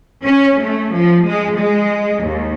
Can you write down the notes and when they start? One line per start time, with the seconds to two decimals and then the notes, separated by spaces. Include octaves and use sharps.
0.24 C#4
0.60 A3
0.93 F3
1.27 G#3
1.57 G#3
2.24 D#2